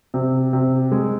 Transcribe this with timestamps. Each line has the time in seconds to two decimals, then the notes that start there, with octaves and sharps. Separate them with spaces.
0.14 C3
0.53 C3
0.92 G#3